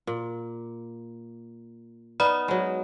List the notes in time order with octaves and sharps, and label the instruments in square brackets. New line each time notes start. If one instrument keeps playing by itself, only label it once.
[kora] A#2
[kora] B3 D#4 [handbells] D5 B5 F6
[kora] F#3 G#3